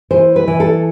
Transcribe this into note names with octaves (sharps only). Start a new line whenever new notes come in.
E3 C5
B4
E3
A4